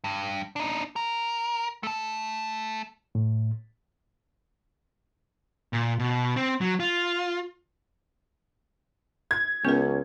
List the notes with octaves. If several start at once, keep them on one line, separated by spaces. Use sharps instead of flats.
G2
D4 D#4
A#4
A3 A4
A2
A#2
B2
C4
F#3
F4
G#6
C#2 B3 C#4 A#4